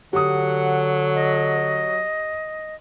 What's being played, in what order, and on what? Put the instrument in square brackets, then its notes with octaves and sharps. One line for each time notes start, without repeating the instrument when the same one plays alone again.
[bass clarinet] D3 [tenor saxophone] F#3 [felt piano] G4 D#6 [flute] F#5
[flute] D#5